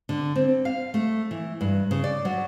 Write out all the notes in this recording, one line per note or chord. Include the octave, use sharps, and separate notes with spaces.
D3
C4
F5
A3
E3
G2
C#3
D5
F#3